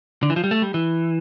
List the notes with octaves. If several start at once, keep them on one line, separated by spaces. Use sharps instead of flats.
D3
E3
F3
G3
A3
G3
E3